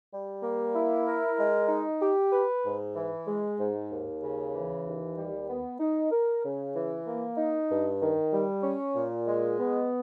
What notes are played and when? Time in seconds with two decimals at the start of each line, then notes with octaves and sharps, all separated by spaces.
0.12 G3
0.42 A#3
0.75 E4
1.06 A#4
1.38 G#3
1.69 D#4
2.00 G4
2.32 B4
2.64 G#2
2.95 E3
3.27 G#3
3.58 G#2
3.90 D#2
4.22 C#3
4.53 E3
4.84 D#2
5.16 G3
5.48 B3
5.79 D#4
6.11 A#4
6.43 C#3
6.75 E3
7.06 A#3
7.37 D#4
7.70 G2
8.01 D#3
8.31 G3
8.63 C#4
8.95 A#2
9.27 G#3
9.58 B3